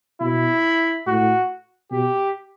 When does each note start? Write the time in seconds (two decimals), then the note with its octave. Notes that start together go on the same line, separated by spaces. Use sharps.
0.21 B2 E4
1.07 A2 F#4
1.92 B2 G4